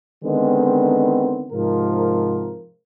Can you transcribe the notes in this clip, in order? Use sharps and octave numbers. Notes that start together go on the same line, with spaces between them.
D3 D#3 G#3 B3 C4
G#2 C3 F3 A#4